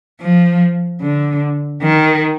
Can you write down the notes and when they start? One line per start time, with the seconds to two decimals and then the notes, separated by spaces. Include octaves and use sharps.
0.21 F3
1.02 D3
1.82 D#3